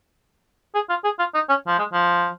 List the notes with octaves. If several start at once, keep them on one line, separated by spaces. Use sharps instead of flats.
G#4
F4
G#4
F4
D#4
C#4
F3
G#3
F3